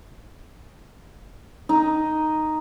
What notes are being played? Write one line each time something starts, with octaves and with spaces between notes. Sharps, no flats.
D#4